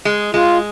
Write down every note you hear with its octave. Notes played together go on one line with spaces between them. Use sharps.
G#3
G#3 F4